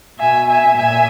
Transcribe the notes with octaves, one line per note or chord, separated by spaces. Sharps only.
B2 E5 G#5
E5 G#5
A#2 E5 G#5